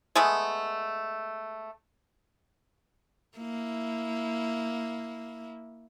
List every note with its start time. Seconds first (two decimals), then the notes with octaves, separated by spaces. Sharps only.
0.15 G#3 A3 B3
3.38 A#3 E4